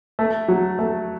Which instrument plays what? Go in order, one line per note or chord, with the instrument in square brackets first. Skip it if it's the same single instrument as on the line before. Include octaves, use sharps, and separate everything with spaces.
[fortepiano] A3
F#3
A3